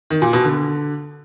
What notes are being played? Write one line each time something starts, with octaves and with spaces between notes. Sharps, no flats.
D#3
A#2
B2
D3